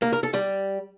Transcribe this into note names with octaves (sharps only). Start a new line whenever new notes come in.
A#3
A#4
A4
G3